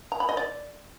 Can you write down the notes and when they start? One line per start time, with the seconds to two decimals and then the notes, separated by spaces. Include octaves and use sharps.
0.12 A#5
0.20 B5
0.29 D#5
0.37 D5